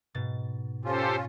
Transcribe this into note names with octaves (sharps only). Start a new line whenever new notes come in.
G#2 B2 A6
C#4 F4 G4 A4 C5